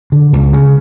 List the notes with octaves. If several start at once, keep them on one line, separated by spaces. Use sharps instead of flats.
D3
C#2
C#3